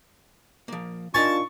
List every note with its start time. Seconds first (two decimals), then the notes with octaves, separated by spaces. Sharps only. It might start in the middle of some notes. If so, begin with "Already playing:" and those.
0.68 F3 A#3
1.14 D4 D#4 F4 A#4 G#5 A5 C#6